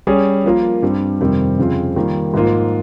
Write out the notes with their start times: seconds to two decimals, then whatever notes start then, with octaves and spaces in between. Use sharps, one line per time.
0.07 G3 C#4 G#4
0.45 F3 A#3 F4 A#4
0.82 G2 G3 C4
1.20 F2 C3 D#3 G3 C4
1.59 F2 C#3 F3 C4 F4
1.96 D#3 G3 A#3 F4 A#4
2.34 G#2 F3 A#3 F4